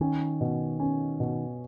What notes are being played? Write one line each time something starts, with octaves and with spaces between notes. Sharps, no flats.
D#3 C#4
B2
C#4
B2